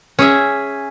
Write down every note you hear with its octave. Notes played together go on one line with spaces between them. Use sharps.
C#4 G#4 E5